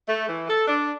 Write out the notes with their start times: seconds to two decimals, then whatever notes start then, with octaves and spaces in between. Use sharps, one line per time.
0.08 A3
0.28 E3
0.49 A4
0.68 D4